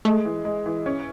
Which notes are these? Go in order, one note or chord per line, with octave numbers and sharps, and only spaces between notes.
G#3 A3
E3
G#3
E3
C#4